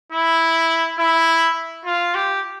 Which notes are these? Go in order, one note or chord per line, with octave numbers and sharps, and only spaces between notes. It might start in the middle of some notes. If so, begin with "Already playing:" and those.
E4
E4
F4
G4